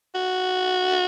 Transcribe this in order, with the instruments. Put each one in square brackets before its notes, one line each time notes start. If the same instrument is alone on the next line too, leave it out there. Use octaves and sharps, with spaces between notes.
[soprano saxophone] F#4